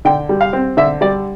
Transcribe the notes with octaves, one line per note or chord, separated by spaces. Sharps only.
D3 G5
G3
F5
C4
D3 E5
G3 D5